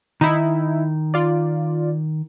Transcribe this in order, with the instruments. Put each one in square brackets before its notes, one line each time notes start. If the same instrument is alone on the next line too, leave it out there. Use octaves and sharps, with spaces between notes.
[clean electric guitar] D#3 [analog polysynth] D#4 E4
[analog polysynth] F4 D5